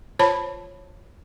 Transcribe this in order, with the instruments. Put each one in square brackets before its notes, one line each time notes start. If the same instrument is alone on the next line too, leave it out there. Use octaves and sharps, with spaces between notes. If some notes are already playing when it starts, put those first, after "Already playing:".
[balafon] F4 C5 C#5 A5 B5